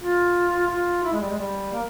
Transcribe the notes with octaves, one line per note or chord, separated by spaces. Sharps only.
F4
F4
E4
G#3
G3
G#3
G3
A#3